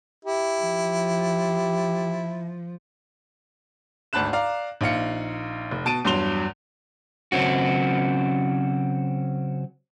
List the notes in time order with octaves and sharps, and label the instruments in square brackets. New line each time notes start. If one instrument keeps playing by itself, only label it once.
[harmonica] E4 [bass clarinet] G4
[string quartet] F3
[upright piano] G#1 D2 A5 B5 F#6 E7
D5 F5 A#5
A#1 D#4 F5 C#7
F1
B2 A5 D7 D#7
E2 G2 F#3 C6 F7 G7
[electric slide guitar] C#3 F#3 C4 C#4 F#4